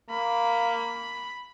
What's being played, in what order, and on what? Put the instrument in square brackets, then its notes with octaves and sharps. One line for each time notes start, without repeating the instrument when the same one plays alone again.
[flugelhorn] A#3 [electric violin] B5